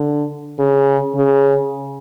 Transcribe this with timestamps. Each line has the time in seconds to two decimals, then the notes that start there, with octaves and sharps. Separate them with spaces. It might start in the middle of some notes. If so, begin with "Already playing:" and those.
Already playing: D3
0.59 C#3
1.15 C#3